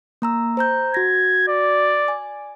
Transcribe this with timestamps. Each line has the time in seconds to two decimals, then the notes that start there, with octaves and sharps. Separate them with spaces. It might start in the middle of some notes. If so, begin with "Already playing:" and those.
0.22 A#3 A#5 E6
0.57 C5 A#5 G6
0.94 F#4 G#6 A#6
1.48 D5
2.08 G#5